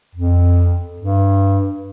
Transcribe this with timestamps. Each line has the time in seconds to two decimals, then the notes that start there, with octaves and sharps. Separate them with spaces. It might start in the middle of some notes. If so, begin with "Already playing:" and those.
0.15 F2
1.00 G2